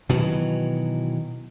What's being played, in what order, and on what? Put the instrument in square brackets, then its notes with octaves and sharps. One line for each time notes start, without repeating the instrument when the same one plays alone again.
[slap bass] B2 D#3 E3 F#3